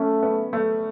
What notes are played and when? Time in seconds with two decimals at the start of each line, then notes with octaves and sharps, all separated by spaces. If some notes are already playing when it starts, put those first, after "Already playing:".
Already playing: A3 C#4
0.23 B3
0.53 A3